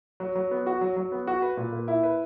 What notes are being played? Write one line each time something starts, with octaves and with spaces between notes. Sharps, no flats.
F#3
F#3
B3
F#4
F#3
F#3
B3
F#4
B4
A#2
A#3
E4
B4